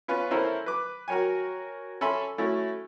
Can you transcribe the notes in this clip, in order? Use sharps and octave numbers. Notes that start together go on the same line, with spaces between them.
B3 C#4 F4 B4
C#4 E4 A4 A#4 C5 E5
B4 D6
F#4 A#4 C#5 G5 G#5
C#4 A4 E5 G#5 B5 C6
A3 C#4 E4 F#4